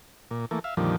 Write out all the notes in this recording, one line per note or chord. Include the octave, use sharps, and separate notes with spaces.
A#2
E3 A3 A#3
E5 F5
F2 A#2 D3 D#3 F3 G3